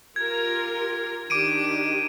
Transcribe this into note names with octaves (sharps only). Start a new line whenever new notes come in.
F4 G4 A#4 G#6
D#3 D4 G4 D6 D7 D#7